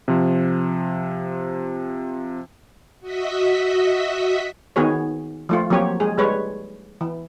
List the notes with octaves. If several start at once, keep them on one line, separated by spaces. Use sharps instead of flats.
C3 F3
F#4 D#5 E5 B6
D#3 B3 F#4 G#4 C#5
F3 A3 F4
F3 F#3 A#3 C4 G4 C#5
G#3 G#4
G3 G#3 B4 C#5
E3